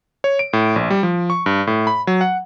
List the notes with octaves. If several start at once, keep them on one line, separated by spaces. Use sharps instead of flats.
C#5
D7
A2
A#1
G3
F3
C#6
G2
A2
B5
F#3
F#5